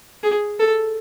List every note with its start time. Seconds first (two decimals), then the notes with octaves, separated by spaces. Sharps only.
0.23 G#4
0.59 A4